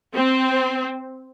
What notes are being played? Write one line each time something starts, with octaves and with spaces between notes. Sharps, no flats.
C4